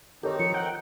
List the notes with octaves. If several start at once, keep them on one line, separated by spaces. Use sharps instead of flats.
D#3 C4 D#4 G4 A4 A#4 C#5
F3 C#7
F#5 G5